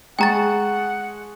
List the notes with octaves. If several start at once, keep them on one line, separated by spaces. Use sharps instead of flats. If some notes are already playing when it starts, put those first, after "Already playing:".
G#3 G#4 F#5 G5 A5 A#5 C#6 A6